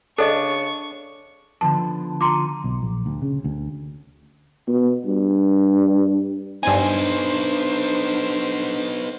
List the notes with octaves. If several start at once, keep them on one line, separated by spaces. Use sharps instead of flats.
C#3 D4 A4 D#5 C#6
D3 F3 B3 A5
F4 A#5 C6 D6 C#7 D#7
B1
A#1
D2
C#3
D2
B2
G2
G2 B3 D4 D#4 C5 G#5